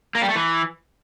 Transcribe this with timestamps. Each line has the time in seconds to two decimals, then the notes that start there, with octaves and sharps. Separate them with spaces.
0.15 A#3
0.22 G3
0.29 A3
0.35 E3